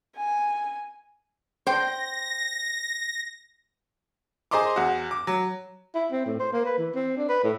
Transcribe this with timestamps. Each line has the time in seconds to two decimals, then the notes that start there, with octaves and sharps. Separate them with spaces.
0.16 G#5
1.67 C5 G5 A#6
4.51 G#4 C5 D#5 A#5 C6 D6
4.76 E2 F#4
5.11 D6
5.27 F#3
5.95 E4
6.12 C4
6.26 A2
6.40 C5
6.53 A#3
6.65 B4
6.78 E3
6.95 C4
7.17 D4
7.29 B4
7.44 A2